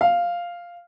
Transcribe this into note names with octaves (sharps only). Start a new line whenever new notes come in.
F5